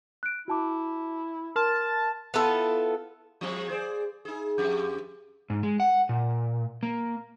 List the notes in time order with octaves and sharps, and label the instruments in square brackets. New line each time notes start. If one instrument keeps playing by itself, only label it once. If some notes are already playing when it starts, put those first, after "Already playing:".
[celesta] F#6 D7
[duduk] E4 [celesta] F#4 A5 D6
[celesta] A#4 C6 F6 [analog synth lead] A5
[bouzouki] B3 E4 F4 A4
[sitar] F3 G#3 C4
G#4 C5 D5
D#4 G#4
F2 G4
[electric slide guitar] G#2
G#3
F#5
A#2
A#3